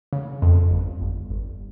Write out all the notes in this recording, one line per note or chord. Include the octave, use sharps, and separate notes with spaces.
C#3
F2
G1
G1
G1